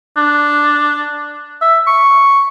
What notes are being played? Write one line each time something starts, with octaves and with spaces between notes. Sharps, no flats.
D4
E5
C#6